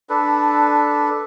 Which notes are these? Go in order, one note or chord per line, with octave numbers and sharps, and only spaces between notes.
D4 A4 B4